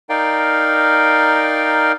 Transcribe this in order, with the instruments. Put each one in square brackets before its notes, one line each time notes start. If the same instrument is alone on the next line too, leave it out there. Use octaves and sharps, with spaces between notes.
[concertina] D#4 A#4 D5 F5 G5